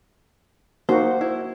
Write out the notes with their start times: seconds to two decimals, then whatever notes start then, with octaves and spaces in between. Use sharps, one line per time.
0.89 A#3 D#4 F#4 C5
1.21 E4